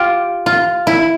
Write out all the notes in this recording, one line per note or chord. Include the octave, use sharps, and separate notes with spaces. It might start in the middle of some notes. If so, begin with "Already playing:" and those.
Already playing: F4 G4
F4
E4